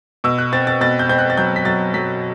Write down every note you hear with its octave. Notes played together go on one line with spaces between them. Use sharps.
B2 E6
F#6
C4 A6
A6
B2 A6
G6
C4 G6
F#6
A6
F#3 G6
B6
F#3 A6
F#3 B6